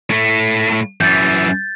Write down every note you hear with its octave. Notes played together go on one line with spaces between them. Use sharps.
A2 A3
F#2 E3 G6 A6